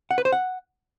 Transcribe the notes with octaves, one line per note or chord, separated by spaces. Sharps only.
F#5
B4
C5
F#5